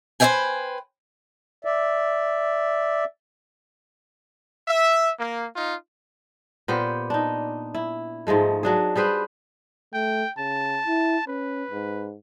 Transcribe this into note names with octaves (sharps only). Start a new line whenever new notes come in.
B4 C5 D5 E5 G5 G#5
D5 E5
E5
A#3
D#4 F4
A#2 B3 G4 C5
D4 D#4
E4
G#2 F3 G#3 A3
F#3 D4 G#4
G3 G#4 B4 C5
A3 G5
C#3 A5
E4
C#4 B4
G#2